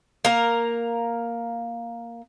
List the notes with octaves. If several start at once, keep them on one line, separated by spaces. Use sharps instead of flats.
A#3 A#4